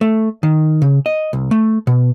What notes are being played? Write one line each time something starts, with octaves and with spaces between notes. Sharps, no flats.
A3
D#3
C#3
D#5
C2
A3
B2